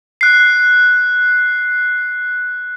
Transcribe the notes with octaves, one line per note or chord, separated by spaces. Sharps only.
F#6 C7